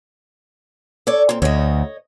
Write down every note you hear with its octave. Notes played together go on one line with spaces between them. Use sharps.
A4 C#5 D5
A#2 C4
D2 C#5 D#5